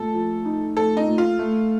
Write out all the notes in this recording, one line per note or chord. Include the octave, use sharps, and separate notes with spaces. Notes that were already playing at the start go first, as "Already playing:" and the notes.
Already playing: A#2 A3 A4
F3
D#4
A3 A4
D#4
A#2
F4
A3